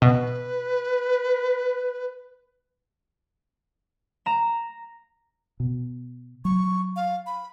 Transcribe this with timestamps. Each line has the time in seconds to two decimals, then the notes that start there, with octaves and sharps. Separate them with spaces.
0.02 B2 B4
4.26 A#5 E7
5.60 B2
6.45 F#3 C#6
6.96 F5
7.26 B5